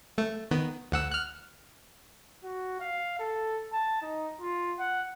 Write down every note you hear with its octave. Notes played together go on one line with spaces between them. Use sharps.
A3
D#3 B3
D2 F#5 E6
F6 F#6
F#4
F5
A4
A5
D#4
F4
F#5